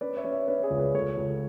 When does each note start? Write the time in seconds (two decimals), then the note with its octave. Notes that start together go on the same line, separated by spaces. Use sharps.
0.01 C#4 B4 D5
0.17 C#5 E5
0.24 C#4
0.32 C#5 E5
0.48 C#4 B4 D5
0.63 G#4 B4
0.70 C#2
0.79 G#4 B4
0.94 C#2 A4 C#5
1.17 C#2